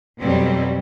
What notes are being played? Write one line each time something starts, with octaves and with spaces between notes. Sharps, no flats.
F2 B2 F#3 G3 C4